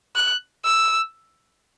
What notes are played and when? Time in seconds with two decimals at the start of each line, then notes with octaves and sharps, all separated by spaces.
0.16 F#6
0.65 E6